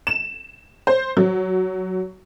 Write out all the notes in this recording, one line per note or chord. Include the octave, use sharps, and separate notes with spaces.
E7
C5
F#3